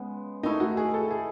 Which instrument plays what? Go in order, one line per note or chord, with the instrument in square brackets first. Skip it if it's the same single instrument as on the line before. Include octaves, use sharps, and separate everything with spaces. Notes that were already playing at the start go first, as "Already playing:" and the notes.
Already playing: [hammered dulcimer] C#3 G#3 B3
[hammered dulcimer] D#3 A3 E4 [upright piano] D#4
[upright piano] F#4
G#4
A4
G#4